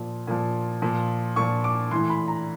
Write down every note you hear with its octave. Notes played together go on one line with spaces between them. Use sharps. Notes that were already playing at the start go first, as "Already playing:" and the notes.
Already playing: A#2 F3
A#2 F3
A#2 F3
A#2 F3 C#6
D6
A2 E3 C6
B5
A#5